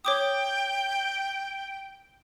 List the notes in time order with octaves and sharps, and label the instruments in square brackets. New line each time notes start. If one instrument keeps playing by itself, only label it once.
[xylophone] C#5 D6 D#6 [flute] G5